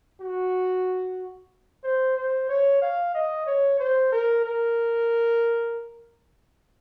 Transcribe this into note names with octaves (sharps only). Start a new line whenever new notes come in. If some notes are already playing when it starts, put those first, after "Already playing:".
F#4
C5
C5
C#5
F5
D#5
C#5
C5
A#4
A#4